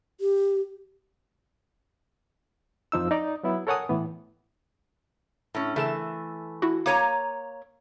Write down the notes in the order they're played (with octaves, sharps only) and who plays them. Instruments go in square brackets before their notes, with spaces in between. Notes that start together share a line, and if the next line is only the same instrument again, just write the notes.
[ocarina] G4
[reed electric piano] F2 F3 D#4 E6
D#4 D5
F#3 B3 E4
A4 A#4 C#5 F#5 G#5 D#6
A2 E3 B3
[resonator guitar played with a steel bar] A2 C#4
[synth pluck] C#3 A#4 E7 [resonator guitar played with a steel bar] E3 A3
[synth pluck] E4 F#4
[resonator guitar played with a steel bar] A#3 C#5 A#5 [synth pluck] D6 D#7